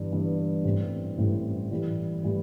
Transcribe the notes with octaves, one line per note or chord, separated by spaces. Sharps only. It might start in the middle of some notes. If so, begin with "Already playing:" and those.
Already playing: G1 G2 E3
G1 G2 E3
A1 A2 G3 C4
A1 A2 G3 C4
A2 E3 G3
A2 E3 G3